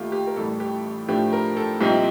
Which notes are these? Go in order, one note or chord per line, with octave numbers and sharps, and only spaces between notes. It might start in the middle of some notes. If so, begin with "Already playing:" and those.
Already playing: D#2 D#3 A3 F4 G4
G4
A#4
A1 A2 G3 A4
G4
A2 F3 A3 D4 G4
A#4
A4
C2 A#2 F3 C4 D#4 G4